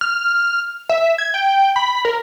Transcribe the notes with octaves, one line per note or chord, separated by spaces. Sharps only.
F6
E5
G#6
G5
B5
A#4